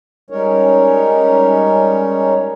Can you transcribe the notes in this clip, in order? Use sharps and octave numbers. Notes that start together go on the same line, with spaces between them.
G3 G#3 C#4 D#4 A#4 C#5